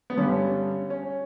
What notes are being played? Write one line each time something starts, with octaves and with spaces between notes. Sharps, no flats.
B3
G2 D3 G3 C#4
C#4